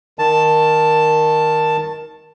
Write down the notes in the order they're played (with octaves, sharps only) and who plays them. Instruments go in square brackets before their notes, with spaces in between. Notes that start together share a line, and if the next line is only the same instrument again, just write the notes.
[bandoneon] D#3 A5